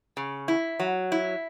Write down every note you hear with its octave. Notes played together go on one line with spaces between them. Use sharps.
C#3
E4
F#3
E4